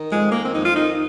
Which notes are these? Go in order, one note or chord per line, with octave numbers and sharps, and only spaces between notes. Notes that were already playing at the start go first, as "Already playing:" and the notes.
Already playing: D#3
F2 G#3
D#3 A#3
C4
F2 D#4
F4
D#3 D#4